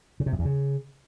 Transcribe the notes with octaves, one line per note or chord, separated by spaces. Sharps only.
C#3
C3
F#2
E2
C#3